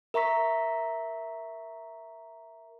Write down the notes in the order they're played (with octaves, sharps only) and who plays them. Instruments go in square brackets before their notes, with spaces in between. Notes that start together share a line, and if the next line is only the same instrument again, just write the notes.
[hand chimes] A#4 E5 A#5 C#6 B6